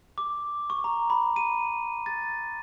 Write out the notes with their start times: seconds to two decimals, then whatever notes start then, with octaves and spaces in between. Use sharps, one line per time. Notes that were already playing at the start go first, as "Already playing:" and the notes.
0.18 D6
0.70 C#6
0.84 A#5
1.10 B5
1.36 D#7
2.06 A6